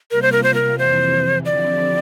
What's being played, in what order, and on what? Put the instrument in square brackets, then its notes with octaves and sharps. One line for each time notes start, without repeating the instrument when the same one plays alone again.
[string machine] C3 G3 A#3 F4 [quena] A#4
[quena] C5
A#4
C5
A#4
[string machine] F2 C3 E3 [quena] C5
[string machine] D3 F3 C4 E4 G4 [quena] D5